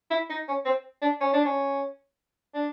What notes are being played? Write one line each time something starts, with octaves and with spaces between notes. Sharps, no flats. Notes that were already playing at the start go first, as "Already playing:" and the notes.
E4
D#4
C#4
C4
D4
C#4
D4
C#4
D4